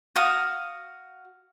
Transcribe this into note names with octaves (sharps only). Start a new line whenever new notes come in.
F#4 F5 D#6